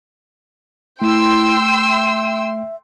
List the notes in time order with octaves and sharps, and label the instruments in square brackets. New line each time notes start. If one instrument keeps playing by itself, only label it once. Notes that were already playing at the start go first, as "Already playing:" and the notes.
[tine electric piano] A3 [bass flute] E4 [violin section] G5 C6 E6
[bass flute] E5